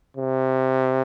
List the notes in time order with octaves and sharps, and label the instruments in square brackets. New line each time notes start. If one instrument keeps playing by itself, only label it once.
[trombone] C3